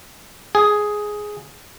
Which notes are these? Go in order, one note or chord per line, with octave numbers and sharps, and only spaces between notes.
G#4